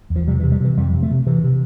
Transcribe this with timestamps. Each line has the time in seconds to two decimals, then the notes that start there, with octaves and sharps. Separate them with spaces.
0.10 E2
0.16 F3
0.27 C3 G3
0.39 E3
0.43 C3
0.52 G3
0.60 C3 E3
0.77 F2 G3
0.94 C3
1.03 A3
1.11 C3
1.27 C3 E3
1.44 C3